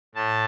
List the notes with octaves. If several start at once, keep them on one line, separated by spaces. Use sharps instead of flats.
A2 A5